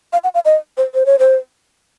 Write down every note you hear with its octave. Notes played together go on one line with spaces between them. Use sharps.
F5
F#5
F5
D#5
C5
C5
C#5
C5